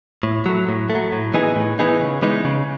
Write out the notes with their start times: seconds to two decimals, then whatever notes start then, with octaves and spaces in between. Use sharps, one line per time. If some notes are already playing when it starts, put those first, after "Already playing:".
0.23 A2
0.46 F#3 A3
0.69 A2
0.90 A3
0.95 F#3
1.12 A2
1.34 E3 B3 D#4 G#4
1.56 A2
1.79 E3 B3 D#4 G#4
2.01 C#3
2.22 E3 G#3 B3 D#4
2.45 C#3